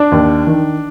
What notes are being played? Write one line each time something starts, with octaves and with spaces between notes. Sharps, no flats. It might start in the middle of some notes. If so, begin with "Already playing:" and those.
Already playing: D4
D#2
D#3